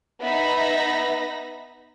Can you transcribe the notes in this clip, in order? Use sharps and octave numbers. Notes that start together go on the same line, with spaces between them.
B3 D#4 E5 B5 A#6